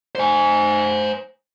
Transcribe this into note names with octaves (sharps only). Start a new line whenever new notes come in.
C5 G#5